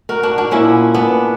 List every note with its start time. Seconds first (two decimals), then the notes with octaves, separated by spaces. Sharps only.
0.09 F#4 A#4
0.23 D4 F#4
0.38 D4 F#4
0.51 A#2 A#3 C#4 E4
0.94 B3 D4